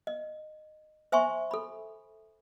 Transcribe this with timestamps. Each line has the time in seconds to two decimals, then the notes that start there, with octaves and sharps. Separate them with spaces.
0.07 D#5
1.12 C5 E5 G#5 C6 C#6
1.51 A4 B5